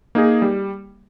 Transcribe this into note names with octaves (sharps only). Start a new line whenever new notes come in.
A#3 D#4 G#4
G3